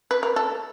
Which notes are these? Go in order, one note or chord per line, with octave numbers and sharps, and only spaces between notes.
B4
A#4
A4